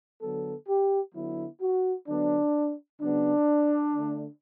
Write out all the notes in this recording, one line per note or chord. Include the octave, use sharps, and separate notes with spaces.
D3 F#3 B3 A4
G4
D3 F#3 B3 E4
F#4
D3 F#3 B3 D4
C#3 F#3 B3 D4
D3 A3